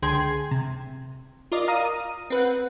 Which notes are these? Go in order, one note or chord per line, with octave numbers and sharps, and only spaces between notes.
C#2 D3 G#4 G5 C6 G#6
C3
F4 A#4 D5 D#5
F5 A#5 D#6 D#7
C4 B4 F#5